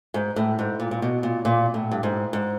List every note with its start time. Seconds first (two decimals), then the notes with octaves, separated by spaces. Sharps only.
0.14 G#2
0.36 A2
0.59 G#2
0.80 A#2
0.91 A#2
1.02 B2
1.23 A#2
1.45 A#2
1.74 A2
1.91 G2
2.03 G#2
2.33 G#2